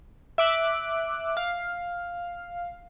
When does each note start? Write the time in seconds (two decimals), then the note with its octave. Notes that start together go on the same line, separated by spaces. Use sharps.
0.38 E5 D6 F#6
1.37 F5